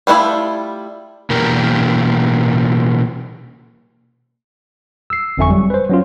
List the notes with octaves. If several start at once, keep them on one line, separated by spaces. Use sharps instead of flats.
G3 A3 D4 E4 F4
B2 E3 A#3 D4 G4 A#4
E6 C7
G1 F2 D3 E5 G#5 C#6
F#3 G3
B4 C5
F#3 C#4 F4